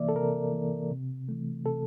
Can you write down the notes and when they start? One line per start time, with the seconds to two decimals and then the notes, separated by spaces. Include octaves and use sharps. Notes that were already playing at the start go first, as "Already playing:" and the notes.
Already playing: C3 E3 A#3 D5 E5
0.09 A4
0.15 C3 A#4
0.52 E3 A#3
0.91 C3
1.29 E3 A3
1.65 C3 A4